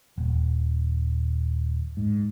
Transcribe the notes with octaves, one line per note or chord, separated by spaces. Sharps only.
D#1
G#2